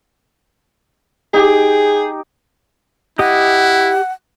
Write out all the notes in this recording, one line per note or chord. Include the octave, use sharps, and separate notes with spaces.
D#4 G4 G#4
E4 G4 D#5 F#5 D#6